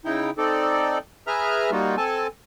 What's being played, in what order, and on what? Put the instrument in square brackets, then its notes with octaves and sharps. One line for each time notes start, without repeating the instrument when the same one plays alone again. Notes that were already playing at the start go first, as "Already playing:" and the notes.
[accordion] C#3 D#4 E4 G5
C4 D#4 A4 D5
G#4 B4 E5 A#5 F6
G3 A#3 D#4 F4 F#4
C4 A4 G#5 A5